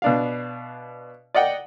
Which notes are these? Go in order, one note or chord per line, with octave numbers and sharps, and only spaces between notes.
B2 D4 F5
D5 D#5 F#5 G5